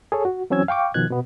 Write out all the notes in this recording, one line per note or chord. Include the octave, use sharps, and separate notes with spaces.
G#4 A4 C#5
F#4
E3 F#3 C4 C#4 E6 G#6
F5 G5 C#6 D6
B2 D#3 F3 F#6 G#6
B2 B3